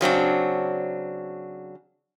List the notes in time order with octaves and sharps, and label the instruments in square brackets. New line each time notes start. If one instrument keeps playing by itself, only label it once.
[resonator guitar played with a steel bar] C#3 F#3 C4 D4